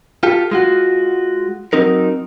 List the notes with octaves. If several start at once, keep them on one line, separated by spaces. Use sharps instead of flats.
F4 G4 A4
G#3 F4 F#4
F#3 C4 D#4 A#4